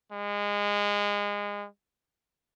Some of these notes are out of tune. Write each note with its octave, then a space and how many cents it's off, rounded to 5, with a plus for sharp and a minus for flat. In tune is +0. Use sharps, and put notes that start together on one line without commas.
G#3 -25